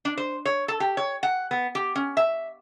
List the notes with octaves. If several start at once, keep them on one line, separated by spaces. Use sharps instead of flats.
D4
C5
C#5
A4
G4
C#5
F#5
B3
G4
C#4
E5